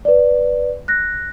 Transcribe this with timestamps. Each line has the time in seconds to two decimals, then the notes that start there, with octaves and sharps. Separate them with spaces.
0.05 B4 D5
0.88 F#6 A#6